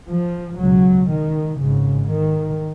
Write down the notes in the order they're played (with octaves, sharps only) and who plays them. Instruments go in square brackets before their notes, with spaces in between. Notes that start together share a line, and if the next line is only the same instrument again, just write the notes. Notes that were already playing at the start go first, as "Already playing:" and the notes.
[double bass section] F3
C#2 B2 F#3
D#3
G#1 G#2 C#3
D#3